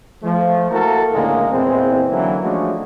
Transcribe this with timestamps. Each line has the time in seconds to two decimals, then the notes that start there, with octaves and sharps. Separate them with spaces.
0.23 F3 A3
0.71 A#3 E4 F#4 A4 A#4
1.13 C#2 A2 D3 E3 G#3 A#3
1.51 E2 A#2 E3 G#3 C4
2.10 D3 E3 F#3 A#3 C#4 E4
2.42 F3 G#3 A3 C#4 D4 F#4